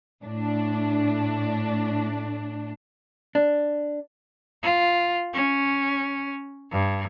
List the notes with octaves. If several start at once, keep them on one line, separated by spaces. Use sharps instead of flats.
A2 D4
D4
F4
C#4
G2